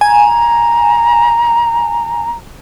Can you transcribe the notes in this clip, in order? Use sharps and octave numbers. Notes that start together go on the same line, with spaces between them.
G#5 A#5